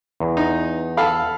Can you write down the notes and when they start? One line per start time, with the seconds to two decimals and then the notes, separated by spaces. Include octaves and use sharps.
0.20 E2
0.37 D#4
0.97 A4 F5 B5